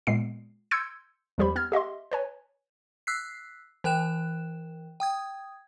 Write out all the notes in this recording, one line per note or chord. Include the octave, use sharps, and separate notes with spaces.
A#2 G#3 B3 C7
C6 E6 G6 G#6 C#7
E2 F3 G3 G4 C5 B5
B3 F6 G#6
G4 D#5 E5 C6
B4 C#5 G#5
E6 F#6 B6 C7
E3 A#4 G5 F#6 E7
G5 D#6 G#6